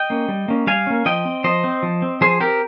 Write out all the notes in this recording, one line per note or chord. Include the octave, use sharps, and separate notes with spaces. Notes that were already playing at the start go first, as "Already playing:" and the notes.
Already playing: D#5 G5
A#3 C#4
G3
A#3 C#4
G3 F5 G#5
A#3 C#4
F3 D#5 G5
C4
F3 C5 D#5
C4
F3
C4
F3 G#4 C5
C4 G4 A#4